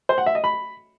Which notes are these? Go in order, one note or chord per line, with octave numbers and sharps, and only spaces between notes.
C5
F#5
E5
D#5
B5